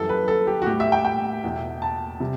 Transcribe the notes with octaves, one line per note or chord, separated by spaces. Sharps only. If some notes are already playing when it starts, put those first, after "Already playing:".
Already playing: F#2 E3 G3 A4
B4
A4
G4
F#4
A2 G3 G4
E5
G5
G5
E2 B2 A3
A5
C3 G3